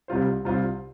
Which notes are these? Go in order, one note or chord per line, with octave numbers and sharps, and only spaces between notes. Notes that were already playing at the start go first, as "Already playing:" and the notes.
C2 C3 G3 F4 C5
C2 C3 G3 F4 C5